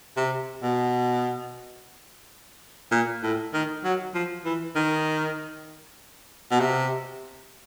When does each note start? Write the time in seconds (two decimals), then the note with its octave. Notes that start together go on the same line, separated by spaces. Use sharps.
0.17 C3
0.63 B2
2.92 A#2
3.23 A2
3.54 D#3
3.84 F#3
4.15 F3
4.45 E3
4.76 D#3
6.51 B2
6.60 C3